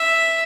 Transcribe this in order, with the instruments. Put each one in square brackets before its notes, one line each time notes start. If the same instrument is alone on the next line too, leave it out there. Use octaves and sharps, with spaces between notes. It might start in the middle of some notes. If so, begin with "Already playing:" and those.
Already playing: [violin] E5